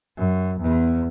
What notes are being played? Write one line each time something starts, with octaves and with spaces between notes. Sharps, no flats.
F#2
E2